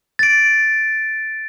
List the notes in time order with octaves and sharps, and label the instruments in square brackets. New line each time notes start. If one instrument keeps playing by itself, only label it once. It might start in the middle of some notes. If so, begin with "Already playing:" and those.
[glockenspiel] A6 D7